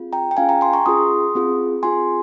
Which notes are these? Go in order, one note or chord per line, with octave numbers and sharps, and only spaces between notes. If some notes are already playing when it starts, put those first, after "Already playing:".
Already playing: C4 F4 G#4
G5 A#5
G5
C#4 F4 G#4 F5 G#5
G5 A#5
G#5 C6
A#5 C#6
C#4 F4 G#4 C6 D#6
C4 F4 G#4
C4 F4 G#4 G#5 C6